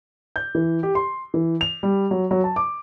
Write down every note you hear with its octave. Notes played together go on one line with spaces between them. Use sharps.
G6
E3
G4
C6
E3
F7
G3
F#3
F#3
A5
D6